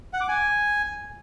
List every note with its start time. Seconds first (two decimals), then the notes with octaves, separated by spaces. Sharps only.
0.13 F#5
0.21 D6
0.28 G#5